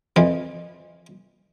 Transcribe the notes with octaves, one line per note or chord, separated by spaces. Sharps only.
F2 E3